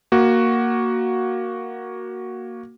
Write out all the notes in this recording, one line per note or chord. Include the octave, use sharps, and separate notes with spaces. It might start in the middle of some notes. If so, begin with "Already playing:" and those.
A#3 F#4